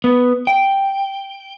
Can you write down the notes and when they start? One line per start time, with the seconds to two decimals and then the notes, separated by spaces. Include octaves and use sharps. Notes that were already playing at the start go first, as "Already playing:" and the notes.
0.04 B3
0.47 G5